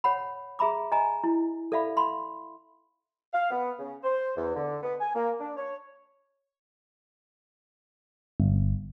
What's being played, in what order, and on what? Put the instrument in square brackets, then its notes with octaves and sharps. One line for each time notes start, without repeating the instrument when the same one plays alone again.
[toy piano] C#5 F#5 B5
G#4 E5 A#5 B5 D6
D#5 G#5 A#5
E4
A4 D5 E5 F5 B5
F5 B5 C6
[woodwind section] F5
B3
C#3
C5
E2
D3
B3
G#5
A#3
D4
C#5
[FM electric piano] G1